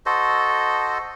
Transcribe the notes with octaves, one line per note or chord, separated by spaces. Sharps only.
F#4 A4 C5 D#5